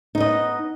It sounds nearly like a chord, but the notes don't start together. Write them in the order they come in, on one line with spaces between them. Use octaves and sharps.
D#4 B3 D#5